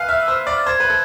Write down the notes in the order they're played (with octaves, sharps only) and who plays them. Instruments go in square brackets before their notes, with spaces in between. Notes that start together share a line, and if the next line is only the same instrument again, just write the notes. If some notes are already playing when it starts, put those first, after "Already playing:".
Already playing: [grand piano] B4 F5 G#5
[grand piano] E5 [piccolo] F6
[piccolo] E6
[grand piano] C5
[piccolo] F6
[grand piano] D5
[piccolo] A6
[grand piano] C5 [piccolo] G#6
[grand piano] B4
A4